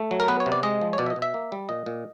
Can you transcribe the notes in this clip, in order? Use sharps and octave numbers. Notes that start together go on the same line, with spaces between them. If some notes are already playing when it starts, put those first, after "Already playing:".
Already playing: A3
F#3
A#4
B3 B4
C#5
C3
D5
G#3 D#5
F3
C#5
B2 D5
E5
D#5
B2
E5
A#3
G3
A#2 D#5
A#2